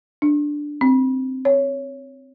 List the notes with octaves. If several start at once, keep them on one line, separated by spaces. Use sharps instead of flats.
D4
C4
C#5